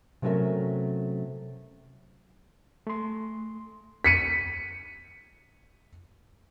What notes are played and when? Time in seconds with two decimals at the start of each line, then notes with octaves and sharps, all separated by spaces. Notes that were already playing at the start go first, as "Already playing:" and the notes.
0.22 C3 F#3 A3 C#4 A#4 E5
2.87 A3 C6
4.04 B6 C#7 D#7